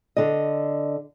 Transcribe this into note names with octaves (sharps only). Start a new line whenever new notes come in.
D3 D#5